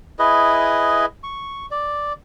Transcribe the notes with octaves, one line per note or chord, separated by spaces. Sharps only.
E4 G#4 B4 D#5
C#6
D5